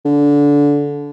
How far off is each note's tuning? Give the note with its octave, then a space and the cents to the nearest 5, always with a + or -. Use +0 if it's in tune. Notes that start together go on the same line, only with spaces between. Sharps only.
D3 -20